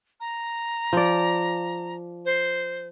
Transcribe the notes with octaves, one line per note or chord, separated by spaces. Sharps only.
A#5
F3 D5
C5